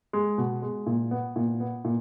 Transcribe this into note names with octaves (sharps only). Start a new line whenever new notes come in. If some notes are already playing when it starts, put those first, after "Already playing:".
G#3
B2
G#3
A#2
B3
A#2
B3
A#2